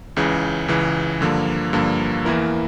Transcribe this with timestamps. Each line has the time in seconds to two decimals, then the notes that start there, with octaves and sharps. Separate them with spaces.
0.16 C#2 C#3 E3
0.68 C#2 C#3 E3
1.21 G2 D3 F3 A#3
1.73 G2 D3 F3 A#3
2.25 E2 E3 A#3 E4 A#4